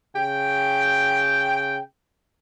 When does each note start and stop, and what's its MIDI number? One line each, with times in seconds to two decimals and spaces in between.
0.14 1.79 49
0.14 1.79 79